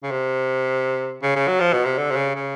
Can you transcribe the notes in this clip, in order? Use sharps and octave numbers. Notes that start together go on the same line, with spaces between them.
C#3
C3
C#3
C#3
F#3
F3
B2
C3
D3
C3
C#3
C#3